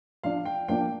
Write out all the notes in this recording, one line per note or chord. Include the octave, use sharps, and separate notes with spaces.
F3 D4 F5
G5
F3 A#3 D4 G5